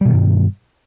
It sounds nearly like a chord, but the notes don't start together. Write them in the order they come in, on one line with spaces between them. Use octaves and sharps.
G3 B2 D#3 G2